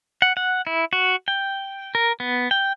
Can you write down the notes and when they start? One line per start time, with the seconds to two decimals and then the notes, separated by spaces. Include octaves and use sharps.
0.22 F#5
0.37 F#5
0.67 E4
0.93 F#4
1.28 G5
1.95 A#4
2.20 B3
2.51 G5